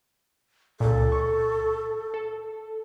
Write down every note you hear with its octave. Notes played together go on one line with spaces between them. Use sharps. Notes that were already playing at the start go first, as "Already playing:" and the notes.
C#2 A#2 A4
C#6
A4